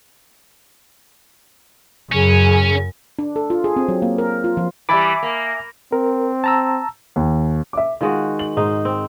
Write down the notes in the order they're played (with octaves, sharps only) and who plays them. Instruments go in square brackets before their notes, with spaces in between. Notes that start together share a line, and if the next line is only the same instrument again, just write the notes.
[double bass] F#2 [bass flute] C#3 [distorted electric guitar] C#4
[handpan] D4
A4
F4
G#4
C4
F#3
A#3
A#4
F4
F3
[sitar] E3 G3 [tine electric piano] E5 G#5 D6 [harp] B5 A6
[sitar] A#3
[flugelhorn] C4 [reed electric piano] A#4
[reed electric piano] A5 A#5 E6
[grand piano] D#2
E5 D6
[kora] D#3 G#3 F#4 [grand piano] F4
[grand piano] F#7
[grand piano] G#2 [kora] D#4 C5
[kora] C4